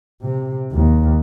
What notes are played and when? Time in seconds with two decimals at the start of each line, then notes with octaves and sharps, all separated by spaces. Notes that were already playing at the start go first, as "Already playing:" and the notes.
0.22 C3
0.71 D#2